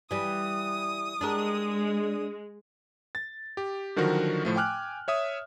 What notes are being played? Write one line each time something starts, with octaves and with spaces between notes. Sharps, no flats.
E3 G3 D#6
G#3 D4 G4 A#4
A6
G4
D3 D#3 F3 F#3 F#4 A#4
A2 F3 A3
G5 G#5 D6 F6 F#6
C#5 E5 D#6